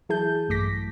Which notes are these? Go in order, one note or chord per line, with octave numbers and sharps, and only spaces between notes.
E3 F#3 E4 G#4 A5 G6
A#1 G2 A3 D6 A#6 B6